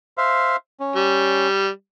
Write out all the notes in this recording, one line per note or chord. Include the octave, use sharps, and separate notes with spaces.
C5 E5 F5
C#4
G3